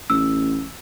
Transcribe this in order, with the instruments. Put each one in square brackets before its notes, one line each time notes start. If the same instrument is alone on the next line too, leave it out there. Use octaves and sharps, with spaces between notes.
[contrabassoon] A1 [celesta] E6